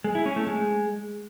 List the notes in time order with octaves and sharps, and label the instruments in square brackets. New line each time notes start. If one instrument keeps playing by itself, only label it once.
[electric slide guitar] G#3
E4
C#4
A3
G#3